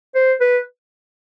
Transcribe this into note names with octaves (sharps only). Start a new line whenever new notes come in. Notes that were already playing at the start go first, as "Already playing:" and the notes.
C5
B4